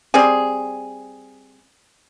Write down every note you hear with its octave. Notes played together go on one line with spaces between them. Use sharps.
G3 C4 G#4